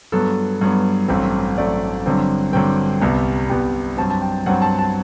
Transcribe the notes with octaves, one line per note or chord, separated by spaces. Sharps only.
G2 F#3 B3 A4
G2 F#3 B3
A1 G2 F#3 A3 C4
A1 G2 F#3 A3 C4 D5
G2 D3 F#3 C4
G2 D3 F#3 C4 G5
C2 C3 G3 B3
C2 C3 G3 B3 G5
G2 F#3 C4 A5
A5
G5
G2 F#3 C4 F#5
A5
A5